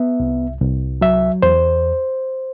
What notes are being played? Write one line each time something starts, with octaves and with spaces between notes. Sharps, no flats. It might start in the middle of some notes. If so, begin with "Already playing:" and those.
Already playing: B3 E5
C2
C2
F#3 E5
E2 C5